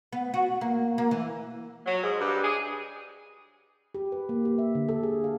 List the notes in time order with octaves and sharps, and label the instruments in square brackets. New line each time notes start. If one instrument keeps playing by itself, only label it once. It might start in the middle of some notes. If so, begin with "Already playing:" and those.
[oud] B3
F#4
A#3
A#3
E3
[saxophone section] F#3
G#2
G2
G#4
[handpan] G4
B4
A#3
G4
E5
D3
A4
G#4
F5